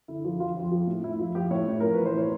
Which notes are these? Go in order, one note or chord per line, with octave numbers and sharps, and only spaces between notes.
D3 E4
F3
F2 F4
F2
F3
A2
A2 E4
F3
F3 G4
A2 C#5
A2
F3 A#4
E3 B4
C5
A2 C#5